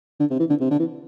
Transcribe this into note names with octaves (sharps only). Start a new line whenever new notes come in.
D3
C3
E3
D3
C3
D3
E3